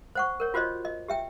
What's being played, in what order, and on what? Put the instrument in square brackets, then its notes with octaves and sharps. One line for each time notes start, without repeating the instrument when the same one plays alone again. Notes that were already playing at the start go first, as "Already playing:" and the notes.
[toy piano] C5 F#5 C#6
A#4 C#5
F4 F#4 C5 C#5 D#5
D#5
G4 E5 G5